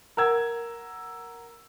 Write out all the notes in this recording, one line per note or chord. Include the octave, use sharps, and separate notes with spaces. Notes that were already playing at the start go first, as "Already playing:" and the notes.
A#4 F#5 E6 G#6